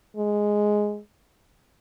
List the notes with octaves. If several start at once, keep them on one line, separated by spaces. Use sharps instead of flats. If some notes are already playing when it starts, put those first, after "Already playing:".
G#3